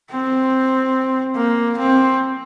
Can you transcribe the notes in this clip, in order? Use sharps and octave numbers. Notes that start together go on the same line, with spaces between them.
C4
A#3
C4